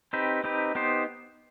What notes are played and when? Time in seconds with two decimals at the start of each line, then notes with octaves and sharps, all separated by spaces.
0.13 C4 D#4 G4 B4
0.44 C4 D#4 G4 B4
0.75 B3 D#4 G4 C5